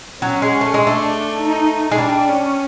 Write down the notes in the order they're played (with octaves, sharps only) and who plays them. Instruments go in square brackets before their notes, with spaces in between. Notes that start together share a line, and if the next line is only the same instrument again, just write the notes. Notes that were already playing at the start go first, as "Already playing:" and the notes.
[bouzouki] F#3 [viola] C#4
[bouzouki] G#3
A3
G#3
[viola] D4
[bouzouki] A3
[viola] D#4
[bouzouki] G#3
[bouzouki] G3 [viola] D4
[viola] C#4